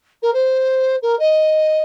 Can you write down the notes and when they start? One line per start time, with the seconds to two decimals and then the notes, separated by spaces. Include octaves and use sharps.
0.22 A#4
0.33 C5
1.02 A#4
1.19 D#5